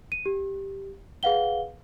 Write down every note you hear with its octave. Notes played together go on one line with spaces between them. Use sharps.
D#7
G4
G#4 B4 F5 F#5 G7